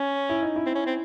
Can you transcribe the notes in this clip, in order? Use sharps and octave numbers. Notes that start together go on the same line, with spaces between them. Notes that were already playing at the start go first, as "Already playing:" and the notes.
Already playing: C#4
E4
D#4
E4
C4
C#4
C4